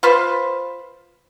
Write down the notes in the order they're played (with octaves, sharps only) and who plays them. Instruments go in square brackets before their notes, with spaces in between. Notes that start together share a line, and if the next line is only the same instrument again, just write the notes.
[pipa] F4 B4 C5